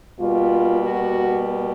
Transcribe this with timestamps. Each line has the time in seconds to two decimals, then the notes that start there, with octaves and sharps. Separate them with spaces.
0.19 B2 G3 A#3 F4
0.82 F#4